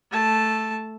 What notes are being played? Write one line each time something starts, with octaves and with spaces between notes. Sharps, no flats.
A3 A5